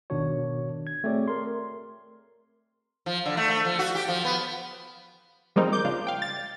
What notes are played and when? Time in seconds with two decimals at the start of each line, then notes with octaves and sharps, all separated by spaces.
0.10 G#1 B2 D#3 D4 F#4 C#5
0.87 G#6
1.04 A3 C4 F#4 G#4 C#5 D5
1.28 A#4 C6
3.06 F3
3.26 D3
3.37 A3
3.50 A3
3.65 F3
3.79 F#4
3.95 G4
4.08 F3
4.25 B3
5.56 F3 G3 G#3 A#3 C4 D#4
5.72 D6 G6
5.85 C#3 D4 F4
6.07 F5 G5
6.22 A6